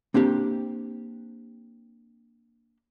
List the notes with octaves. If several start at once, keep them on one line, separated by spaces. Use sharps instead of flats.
A#3 C4 D4 G4